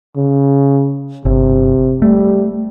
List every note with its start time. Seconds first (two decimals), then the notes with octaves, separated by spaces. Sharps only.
0.16 C#3
1.25 G1 C3
2.02 G3 A3